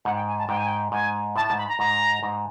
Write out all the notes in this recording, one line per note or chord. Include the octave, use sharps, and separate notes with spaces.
G#2 F#5
G5
G#5
A5
G#2 G5
G#5
G5
G#2 G#5
A2 A5
A5
G#2
B5
A#5
G#2 A#5
G#2